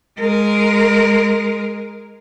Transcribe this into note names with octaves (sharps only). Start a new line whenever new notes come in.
G#3 A#4